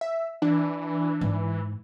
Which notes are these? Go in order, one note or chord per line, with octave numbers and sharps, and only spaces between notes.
E5
E3 D4
G#2